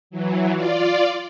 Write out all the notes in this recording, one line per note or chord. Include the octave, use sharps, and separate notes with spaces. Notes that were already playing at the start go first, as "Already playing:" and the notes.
E3 F#3
F4 D5